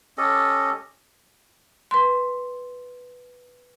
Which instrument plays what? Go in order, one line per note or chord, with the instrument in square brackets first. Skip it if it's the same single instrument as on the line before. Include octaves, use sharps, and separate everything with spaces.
[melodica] C#4 G4 A4 D#5
[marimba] B4 C6